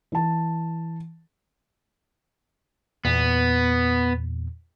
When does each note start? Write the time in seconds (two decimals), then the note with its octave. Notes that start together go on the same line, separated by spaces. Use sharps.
0.12 E3 A5
3.05 E2 A#2 B3